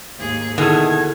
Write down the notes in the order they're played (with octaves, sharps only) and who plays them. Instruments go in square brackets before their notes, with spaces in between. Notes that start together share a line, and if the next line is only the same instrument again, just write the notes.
[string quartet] D#2 G#2 G#4
[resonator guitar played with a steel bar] B2 D#3 [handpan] D3 E4 [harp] G#4 A4 [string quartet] G#6